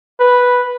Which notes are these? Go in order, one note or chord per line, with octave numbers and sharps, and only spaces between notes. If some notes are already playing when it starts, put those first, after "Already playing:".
B4